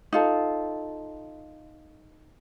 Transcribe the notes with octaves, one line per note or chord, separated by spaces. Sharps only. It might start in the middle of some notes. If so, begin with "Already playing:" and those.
D#4 F4 A4